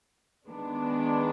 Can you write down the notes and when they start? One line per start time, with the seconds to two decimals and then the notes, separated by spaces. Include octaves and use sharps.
0.48 D#3 G#3 B3 D4